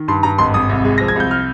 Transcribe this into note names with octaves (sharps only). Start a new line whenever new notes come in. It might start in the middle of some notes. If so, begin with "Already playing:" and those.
Already playing: D#3
G2 C6
G2 A#5
G#1 C6
G#1 D#6
C2
G#3
F3 A#6
G#6
C2 G6
F6